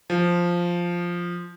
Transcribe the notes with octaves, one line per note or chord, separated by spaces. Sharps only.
F3